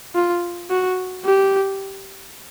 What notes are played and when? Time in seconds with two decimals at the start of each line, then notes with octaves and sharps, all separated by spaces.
0.15 F4
0.70 F#4
1.25 G4